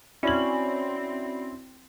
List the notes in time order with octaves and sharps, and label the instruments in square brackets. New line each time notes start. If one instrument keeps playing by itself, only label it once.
[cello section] C4 [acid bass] C#4 [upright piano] E4 F#7 [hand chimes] F#4 D5 B5